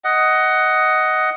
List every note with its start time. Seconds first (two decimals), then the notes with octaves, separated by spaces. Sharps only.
0.04 D#5 F#5